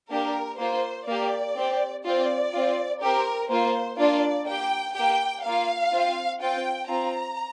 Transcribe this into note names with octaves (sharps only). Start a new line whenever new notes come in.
A#3 D4 G4 A#4
A#3 F4 C5
A#3 G4 D5
C4 G4
C4 F4 D5
C4 F4
C4 G4 A#4
A#3 F4 C5
A#3 D4 F4 D5
A#3 G4 G5
A#3 G4 G5
A#3 F4 F5
C4 F4
C4 F4 G5
C4 F4 A#5